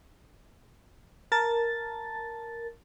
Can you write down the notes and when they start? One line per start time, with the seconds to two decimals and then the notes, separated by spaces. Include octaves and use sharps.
1.32 A#4 A5 A6